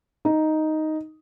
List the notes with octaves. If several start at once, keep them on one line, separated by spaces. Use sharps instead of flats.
D#4